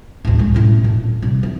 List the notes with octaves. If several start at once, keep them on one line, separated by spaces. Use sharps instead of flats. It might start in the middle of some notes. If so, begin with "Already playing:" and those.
D2 A2
D3 G#3
F#2 A2
A#2 D3
C2
E3